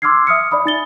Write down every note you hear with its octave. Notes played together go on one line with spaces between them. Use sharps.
C6 D6 E6 F6 G#6 C7
E5 D#6 F6 C#7
D5 E5 B5 D#6
D#4 A6 G7